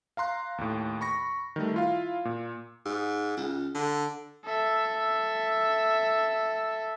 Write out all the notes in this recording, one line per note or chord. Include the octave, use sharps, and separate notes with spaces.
F5 A#5 C6 F#6
D#2 A2
B5 C#6 A#6
D#3 G3 A3
E4 F4 F5
A#2
G#2
C#2
D3
A4 E5